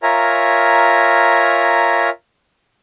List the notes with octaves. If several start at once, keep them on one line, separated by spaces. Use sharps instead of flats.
F4 A#4 C#5 E5 G#5 A#5